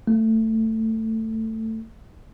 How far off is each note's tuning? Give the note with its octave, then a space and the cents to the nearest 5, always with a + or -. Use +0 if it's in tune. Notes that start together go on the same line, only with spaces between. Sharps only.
A3 +15